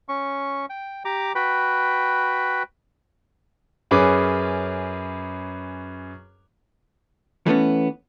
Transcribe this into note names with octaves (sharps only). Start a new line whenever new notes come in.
C#4 C#6
G5
G4 A#5 D6
F#4 B4 G5 B5
F#2 C#4 G#4 B4 D6
E3 A3 B3 C#4